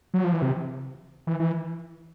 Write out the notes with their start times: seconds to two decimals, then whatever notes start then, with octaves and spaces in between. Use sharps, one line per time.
0.14 F#3
0.24 F3
0.33 E3
0.42 C3
1.27 E3
1.40 E3